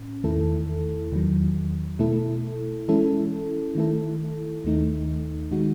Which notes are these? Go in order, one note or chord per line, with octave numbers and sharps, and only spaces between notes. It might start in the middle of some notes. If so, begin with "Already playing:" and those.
Already playing: A2 C#4
E2 D#3 A3 E4 A4
E2 D#3 F#3
B2 A3 E4 A4
E3 G#3 C#4 E4 A4
D#3 A3 E4 A4
D#2 D#3 A3 D#4
D#3 G#3 D#4 F#4